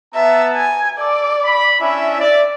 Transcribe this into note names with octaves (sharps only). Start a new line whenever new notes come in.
B3 E5 A5 A#5
G#5
A4 D5 D6
B5
C#4 D4 E4 E5
D5